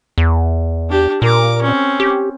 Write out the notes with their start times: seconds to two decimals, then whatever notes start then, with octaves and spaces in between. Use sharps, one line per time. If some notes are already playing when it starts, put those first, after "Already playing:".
0.18 E2
0.90 D4 G4
1.22 A#2 A#4 D6
1.62 C4 C#4
2.00 G4